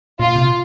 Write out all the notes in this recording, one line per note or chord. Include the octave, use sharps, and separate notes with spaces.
A#2 F4
C3